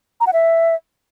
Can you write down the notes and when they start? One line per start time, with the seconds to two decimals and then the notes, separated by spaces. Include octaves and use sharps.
0.21 A#5
0.27 F#5
0.33 E5